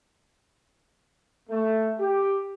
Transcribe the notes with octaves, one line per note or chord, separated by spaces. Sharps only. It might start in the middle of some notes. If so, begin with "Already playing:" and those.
A3
G4